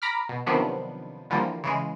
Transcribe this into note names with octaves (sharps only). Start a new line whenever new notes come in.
A#5 B5 D6 F6
B2
C3 D#3 F3 F#3 B3 D4
D3 E3 F3 G3 A#3
C#3 E3 G#3